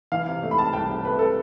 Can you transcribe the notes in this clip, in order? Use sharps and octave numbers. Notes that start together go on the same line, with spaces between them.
E3 F5
C3
A3
B5
C3 A5
C2 G5
C3
A3 B4
C3 A4